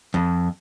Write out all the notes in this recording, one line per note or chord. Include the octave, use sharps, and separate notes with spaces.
F2